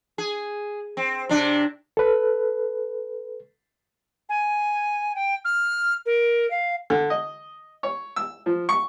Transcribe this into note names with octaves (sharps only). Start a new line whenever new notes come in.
G#4
C4
C3 D4
A4 B4
G#5
G5
F6
A#4
F5
D3
D#5
C#5
E6
F3
C#6